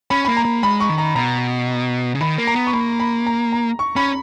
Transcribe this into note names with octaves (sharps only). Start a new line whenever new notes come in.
C#4 B5
A#3 B5
A#5
A#3
G#3 B5
C#6
D#3
A#5
B2 A#5
C#3
D#3 B5
A#3
A#5
B3
C#6
A#3 B5
B5
A#5
A#5
C#6
C#4 B5